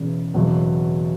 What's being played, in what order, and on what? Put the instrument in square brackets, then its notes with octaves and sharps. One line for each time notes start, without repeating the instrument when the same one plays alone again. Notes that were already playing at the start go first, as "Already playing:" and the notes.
Already playing: [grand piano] E1 E2 C#3
F#1 E2 B2 F#3